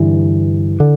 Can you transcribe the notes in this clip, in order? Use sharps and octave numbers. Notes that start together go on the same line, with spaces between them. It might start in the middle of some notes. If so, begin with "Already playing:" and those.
Already playing: G2 D3 E3
D3